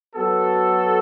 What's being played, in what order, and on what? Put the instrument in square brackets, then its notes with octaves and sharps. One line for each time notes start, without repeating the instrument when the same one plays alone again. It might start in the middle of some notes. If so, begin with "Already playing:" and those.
[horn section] F#3 B3 F#4 A4